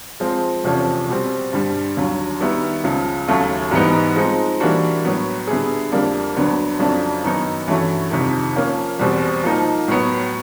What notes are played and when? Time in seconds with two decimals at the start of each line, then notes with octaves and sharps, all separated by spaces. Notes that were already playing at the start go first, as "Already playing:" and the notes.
0.20 F3 G#3 C4
0.64 E2 C3 F3 A3 C#4
1.09 B2 G3 C4
1.53 G2 D3 G3
1.97 D#2 D3 F#3
2.40 D#3 G3 B3 E4
2.84 C#2 C#3 F3
3.28 D#2 C#3 F#3 A3
3.71 G#2 E3 G3 B3 D#4
4.16 F3 G#3 C4 D#4
4.60 E3 G3 A#3 D4 F#4
5.04 A2 F#3 B3
5.47 D3 G3 B3 E4 G#4
5.92 F2 D3 G3 A#3 D4
6.36 D2 D3 F#3 B3 D4
6.79 F2 C#3 F#3 A3 D4
7.24 F#2 D#3 F#3 B3 D#4
7.68 G2 E3 A3 C#4 F#4
8.11 F2 C3 D#3
8.56 F3 A#3 C#4
8.99 E2 B2 G3 C4
9.44 F3 A#3 D#4
9.88 A2 F#3 B3